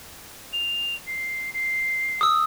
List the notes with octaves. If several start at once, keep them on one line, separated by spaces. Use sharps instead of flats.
F7
C7
C7
D#6 E6